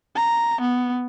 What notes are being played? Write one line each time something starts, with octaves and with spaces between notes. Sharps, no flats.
A#5
B3